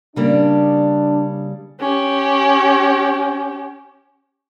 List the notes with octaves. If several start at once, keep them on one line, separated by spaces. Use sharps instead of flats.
C#3 G3 A#3 D4
C#4 G4